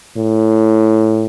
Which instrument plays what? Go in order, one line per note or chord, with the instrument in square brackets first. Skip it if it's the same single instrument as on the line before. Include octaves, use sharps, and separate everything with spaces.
[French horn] A2